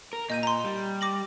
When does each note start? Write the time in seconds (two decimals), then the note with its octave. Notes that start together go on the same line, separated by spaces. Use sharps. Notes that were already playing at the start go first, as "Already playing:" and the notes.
0.13 A#4
0.30 A#2 D#5 G6 D#7
0.43 A#5 C6
0.64 G3
1.01 D6 A#6 F#7